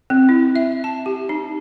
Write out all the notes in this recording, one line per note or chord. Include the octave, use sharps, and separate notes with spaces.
C4
E4
E5
A5
G4
D#4